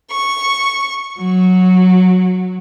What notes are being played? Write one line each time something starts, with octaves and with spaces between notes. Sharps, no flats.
C#6
F#3